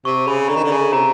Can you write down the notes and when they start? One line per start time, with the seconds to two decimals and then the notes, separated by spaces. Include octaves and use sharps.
0.05 C3 C#6
0.27 C#3 B5
0.49 D3 A#5
0.56 D#3
0.63 D3
0.71 C#3
0.93 C3 A#5